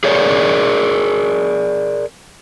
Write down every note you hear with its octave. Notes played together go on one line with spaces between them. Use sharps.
G#4 A#4 C#5 D5